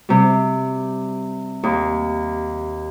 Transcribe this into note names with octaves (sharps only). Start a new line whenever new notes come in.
C3 G3
D#2